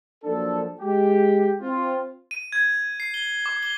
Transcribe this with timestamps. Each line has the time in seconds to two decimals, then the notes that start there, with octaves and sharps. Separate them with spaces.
0.24 F3 F#3 A#3 D4 A4
0.81 G#3 G4
1.62 C4 F4
2.31 D#7
2.52 G#6
3.00 C7
3.14 G7
3.46 D6
3.63 G7